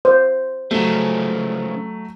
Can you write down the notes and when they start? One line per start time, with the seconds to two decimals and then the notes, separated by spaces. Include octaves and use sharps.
0.05 C5
0.71 C#3 F3 F#3 A3